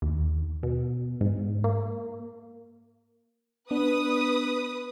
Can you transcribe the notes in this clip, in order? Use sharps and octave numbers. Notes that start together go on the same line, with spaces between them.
D#2
B2
G#2
A#3
B3 D4 B4 D#6